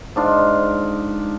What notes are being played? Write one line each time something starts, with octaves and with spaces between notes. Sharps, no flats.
G#2 D4 F4